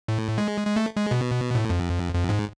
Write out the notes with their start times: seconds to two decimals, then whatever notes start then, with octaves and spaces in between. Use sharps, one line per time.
0.08 A2
0.38 G#3
0.67 G#3
0.76 A3
0.97 G#3
1.11 B2
1.55 A2
1.70 F2
2.14 F2
2.29 G#2